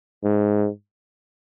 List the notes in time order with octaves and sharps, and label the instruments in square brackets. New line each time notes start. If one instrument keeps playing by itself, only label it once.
[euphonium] G#2